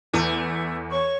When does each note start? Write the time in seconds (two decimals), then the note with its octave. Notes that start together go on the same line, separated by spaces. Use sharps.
0.13 E2 A3
0.90 C#5 C#6